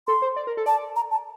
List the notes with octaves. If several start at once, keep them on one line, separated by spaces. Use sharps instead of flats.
A4 C6
C5
D5
A#4
A4
D5 A5
A#5
A5